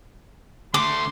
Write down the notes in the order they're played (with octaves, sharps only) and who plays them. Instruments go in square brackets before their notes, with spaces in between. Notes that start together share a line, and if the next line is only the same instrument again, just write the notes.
[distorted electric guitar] D3 A3 [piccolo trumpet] C6 [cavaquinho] D6